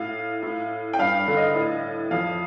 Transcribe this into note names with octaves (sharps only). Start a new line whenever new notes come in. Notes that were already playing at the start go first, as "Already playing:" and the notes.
Already playing: A2 F5
A2
G5
G2 F5
D3
D#5
A2
F2 F5